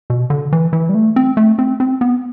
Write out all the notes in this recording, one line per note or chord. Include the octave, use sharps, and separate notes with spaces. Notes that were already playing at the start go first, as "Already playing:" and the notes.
B2
D3
E3
E3
G3
A3
C4
A3
C4
C4
B3